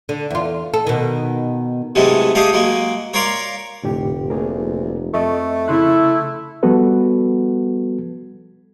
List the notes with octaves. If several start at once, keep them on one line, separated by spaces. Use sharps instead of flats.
D3
E2 F4
A4
B2 D#3
C3 E3 F#3 G#3 A3
A3 G4 G#4 D#5 F5
F#3 G#3 A#3
A#4 C#5 D5 F5 A#5 C6
F1 A2 D3 G4
D2 A#3 G#4 A#4
F2 A3 D#5 E5 C#6
C#3 E4 C6 F#6
F3 G3 B3 F#4 A4 B4